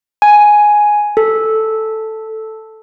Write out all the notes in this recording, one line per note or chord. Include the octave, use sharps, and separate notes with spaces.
G#5
A4